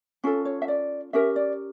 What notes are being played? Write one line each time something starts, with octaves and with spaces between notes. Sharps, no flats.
C#4 F4 A4
C#5
E5
D5
C#4 G4 A#4 E5
D5